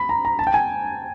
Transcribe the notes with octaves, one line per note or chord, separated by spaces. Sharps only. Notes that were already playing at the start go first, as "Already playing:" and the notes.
Already playing: B5
A#5
A#5
A5
G5
G#5